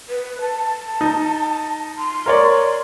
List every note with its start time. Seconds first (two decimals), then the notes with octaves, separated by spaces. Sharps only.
0.09 B4
0.41 A5
1.01 D#4
1.98 C6
2.26 A#4 C#5 D5